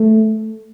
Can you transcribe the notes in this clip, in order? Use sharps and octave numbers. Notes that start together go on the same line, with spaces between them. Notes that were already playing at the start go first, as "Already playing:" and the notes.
Already playing: A3